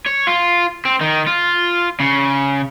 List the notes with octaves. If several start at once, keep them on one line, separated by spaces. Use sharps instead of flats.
C#5
F4
C4
D#3
F4
C#3